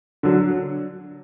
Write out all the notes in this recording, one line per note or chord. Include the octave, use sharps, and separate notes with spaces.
D3 F#3